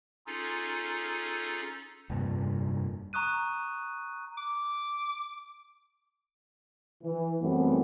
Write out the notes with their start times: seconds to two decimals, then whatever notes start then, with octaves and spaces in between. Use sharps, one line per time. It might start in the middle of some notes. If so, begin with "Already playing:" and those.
0.27 C#4 D#4 F4 G#4 A4
2.10 F1 G2 A#2
3.13 A#5 C#6 D#6 F#6 D#7
4.37 D6
7.03 E3
7.41 F#2 E3 G3 A3 B3 C4